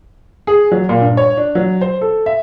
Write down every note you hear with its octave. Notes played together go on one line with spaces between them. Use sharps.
G#4
F#3
A#2
G2
C#5
D4
F#3
C5
A4
E5